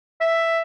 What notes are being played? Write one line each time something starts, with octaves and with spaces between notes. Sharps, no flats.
E5